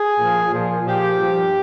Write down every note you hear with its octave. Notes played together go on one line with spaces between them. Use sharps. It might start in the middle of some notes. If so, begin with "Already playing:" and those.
Already playing: G#4
A#2 F3
A#2 F3
A#2 F3 G4
G2 F3